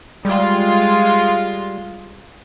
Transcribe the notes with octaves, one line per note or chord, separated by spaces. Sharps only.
G3 G#3 F4